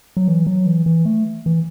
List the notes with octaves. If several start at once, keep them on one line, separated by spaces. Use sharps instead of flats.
F#3
E3
F#3
E3
E3
A3
E3